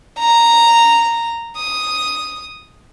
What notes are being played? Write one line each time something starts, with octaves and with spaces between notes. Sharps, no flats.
A#5
D#6